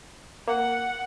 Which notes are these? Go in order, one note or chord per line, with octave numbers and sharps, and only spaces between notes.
A#3 F#5